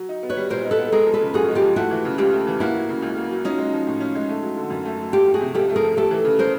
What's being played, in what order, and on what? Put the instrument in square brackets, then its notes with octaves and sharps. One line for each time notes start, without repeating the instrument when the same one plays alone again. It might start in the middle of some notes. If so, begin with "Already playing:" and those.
Already playing: [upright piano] F#3
D#4
B3
[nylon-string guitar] B4 C#5
[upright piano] G3
[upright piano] A#2 [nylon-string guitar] A#4 C5
[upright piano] D#4
[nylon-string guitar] A4 B4
[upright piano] B3
[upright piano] G#3 [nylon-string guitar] G#4 A#4
[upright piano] F3
[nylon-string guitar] A4 B4
[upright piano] C#3
[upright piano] F#2 [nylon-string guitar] F#4 G#4
[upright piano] G#3
[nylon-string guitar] F4 G4
[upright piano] F3
[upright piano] A3 [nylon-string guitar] E4 F#4
[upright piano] E3
C#3
[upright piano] C#2 [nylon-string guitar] F4 G4
[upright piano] A3
E3
[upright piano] A#3 [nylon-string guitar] E4 F#4
[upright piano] F#3
C#3
C#2
A#3
F#3
[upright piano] C#4 [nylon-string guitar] D#4 F4
[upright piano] G#3
F3
A2
C#4
G#3
A3
F#3
D3
F#2
A3
F#3
[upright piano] A3 [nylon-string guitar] F4 G4
[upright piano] F3
[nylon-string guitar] F#4 G#4
[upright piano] C3
[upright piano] C#2 [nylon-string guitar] G4 A4
[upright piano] A3
[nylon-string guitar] G#4 A#4
[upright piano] F3
[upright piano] A3 [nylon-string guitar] G4 A4
[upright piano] E3
C#3
[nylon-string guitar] A#4 C5